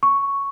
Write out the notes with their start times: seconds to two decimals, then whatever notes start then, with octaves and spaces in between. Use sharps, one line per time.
0.03 C#6